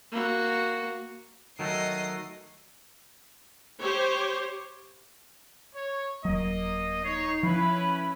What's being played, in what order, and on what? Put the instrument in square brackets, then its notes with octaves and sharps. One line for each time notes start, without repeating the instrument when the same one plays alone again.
[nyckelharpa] A#3 F#4
[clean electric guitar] D#3 F#3 A3 [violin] D#5 C7
[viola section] G4 C5 C#5
[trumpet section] C#5
[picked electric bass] D#1 F#3 [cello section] A#3 [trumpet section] D#5
[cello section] D#4 [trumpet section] C#5 [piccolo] C7
[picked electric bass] F3 [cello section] C#4 E4 [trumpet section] B4 [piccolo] B5